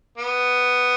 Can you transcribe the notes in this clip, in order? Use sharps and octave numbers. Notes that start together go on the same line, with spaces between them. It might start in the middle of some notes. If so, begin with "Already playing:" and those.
B3